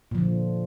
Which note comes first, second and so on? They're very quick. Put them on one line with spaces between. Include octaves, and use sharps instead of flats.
A#2 F3 D3